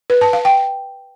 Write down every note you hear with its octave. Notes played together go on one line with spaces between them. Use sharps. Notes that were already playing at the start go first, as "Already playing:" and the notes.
B4
A5
F5
G5